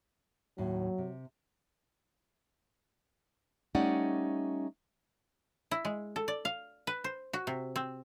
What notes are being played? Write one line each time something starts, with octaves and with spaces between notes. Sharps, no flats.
D#2 A2 F#3
C3
G3 A3 C#4 D#4 D5 F#5
E4
G#3
A4
D5
F5
B4
C5
F#4
C3
C4